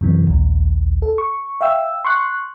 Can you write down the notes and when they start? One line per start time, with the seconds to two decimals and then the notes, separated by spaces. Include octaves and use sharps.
0.01 F#2 C3 E3
0.27 A#1 D#2
1.02 A4
1.18 C#6
1.61 E5 F5 G5 E6
2.05 C6 C#6 F#6